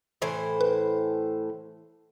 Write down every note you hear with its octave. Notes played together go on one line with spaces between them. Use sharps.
A2 E3 C5
B4